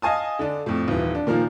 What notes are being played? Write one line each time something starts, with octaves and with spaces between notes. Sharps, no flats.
D#5 F5 G#5 A5 D#6
D3 D4
F2 A2
D#1 E3
D4
A#2 D#3 F3 A#3